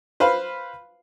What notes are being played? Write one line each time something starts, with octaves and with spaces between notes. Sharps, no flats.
B4 C5 F5 B5